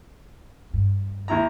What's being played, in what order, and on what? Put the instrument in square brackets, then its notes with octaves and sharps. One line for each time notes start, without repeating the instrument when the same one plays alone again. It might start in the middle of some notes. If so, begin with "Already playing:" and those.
[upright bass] G2
[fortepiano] D#2 E4 A#5